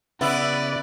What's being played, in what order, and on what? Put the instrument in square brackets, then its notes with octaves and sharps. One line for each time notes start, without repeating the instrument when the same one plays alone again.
[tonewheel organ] C#3 [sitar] B3 E4 [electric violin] B4 D5